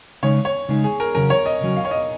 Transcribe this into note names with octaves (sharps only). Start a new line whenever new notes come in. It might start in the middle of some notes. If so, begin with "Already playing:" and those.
C#3 G#3 D#4 C#5
C#5
C#3 G#3 D#4
G#4
A#4
C#3 F#3 C#4 A#4
C#5
D#5
C#3 F#3 C#4
F5
C#5
D#5